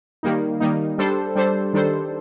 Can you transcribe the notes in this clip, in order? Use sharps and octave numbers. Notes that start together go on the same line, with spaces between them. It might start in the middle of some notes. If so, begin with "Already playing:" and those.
D#3 G3 A#3 D#4
D#3 G3 A#3 D#4
G3 D4 A4 C5
G3 D4 A4 C5
D#3 G3 D4 A4 C5